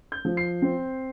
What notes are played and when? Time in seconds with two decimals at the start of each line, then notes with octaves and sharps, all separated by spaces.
0.12 G6
0.25 F3
0.37 C7
0.62 C4